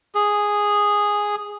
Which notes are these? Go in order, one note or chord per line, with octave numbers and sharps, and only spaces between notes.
G#4